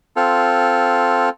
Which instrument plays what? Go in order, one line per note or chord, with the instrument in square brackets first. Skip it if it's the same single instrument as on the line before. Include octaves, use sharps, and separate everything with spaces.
[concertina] C4 F4 A4